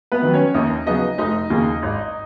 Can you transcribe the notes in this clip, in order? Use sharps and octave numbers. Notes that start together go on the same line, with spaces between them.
B3 B4
D#3 F#3
C#4 C#5
D#2 D#4 D#5
C#3 F#3 B3 D#4 D#5
F1 D#4 D#5
D#2 C#3
G#1